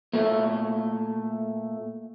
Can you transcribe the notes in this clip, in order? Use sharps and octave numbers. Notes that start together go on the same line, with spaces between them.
A#2 A3